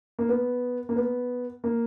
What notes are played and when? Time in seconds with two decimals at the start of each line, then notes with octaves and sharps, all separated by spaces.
0.19 A#3
0.29 B3
0.89 A#3
0.96 B3
1.64 A#3